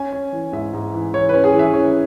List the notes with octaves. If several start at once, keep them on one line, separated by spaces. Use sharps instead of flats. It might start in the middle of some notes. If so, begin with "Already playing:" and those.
Already playing: C#4 G#5
C#4
E3
G#2 E5
G#2
E3
E3 C#5
B4
C#4
G#4
E3
E5
C#4